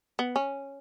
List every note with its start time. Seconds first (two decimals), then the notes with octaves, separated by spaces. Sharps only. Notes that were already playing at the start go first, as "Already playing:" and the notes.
0.19 B3
0.36 C#4